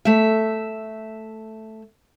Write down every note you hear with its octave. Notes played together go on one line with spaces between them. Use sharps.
A3 E5